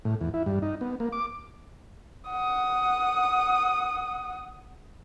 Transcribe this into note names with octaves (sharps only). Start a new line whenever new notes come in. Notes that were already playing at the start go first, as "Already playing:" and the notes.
A2
E2
E4
G2
D#4
B3
A#3
D6
F#5 D#6